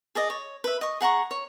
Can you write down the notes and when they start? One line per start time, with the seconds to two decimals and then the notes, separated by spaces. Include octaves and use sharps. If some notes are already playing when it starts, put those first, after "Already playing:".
0.15 G#4 D5 D#5
0.30 C#5
0.64 B4 E5
0.81 D#5 C#6
1.01 G#4 F#5 A#5 C#6
1.31 C#5